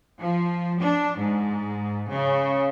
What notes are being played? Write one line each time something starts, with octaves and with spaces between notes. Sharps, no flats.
F3
D4
G#2
C#3